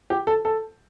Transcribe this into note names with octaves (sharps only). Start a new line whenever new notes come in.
G4
A4
A4